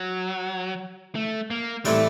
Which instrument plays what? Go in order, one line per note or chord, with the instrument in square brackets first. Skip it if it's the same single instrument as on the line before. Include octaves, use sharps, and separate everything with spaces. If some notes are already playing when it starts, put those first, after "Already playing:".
Already playing: [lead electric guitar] F#3
A3
A#3
[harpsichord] A2 E3 G3 C4 [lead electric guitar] A3